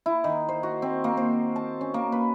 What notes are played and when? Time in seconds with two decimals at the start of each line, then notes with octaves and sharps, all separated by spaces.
0.06 E4
0.24 D#3
0.48 C5
0.63 F#4
0.82 C4
1.04 A#3
1.17 C5
1.56 A5
1.81 C#4
1.94 A#3
2.12 B4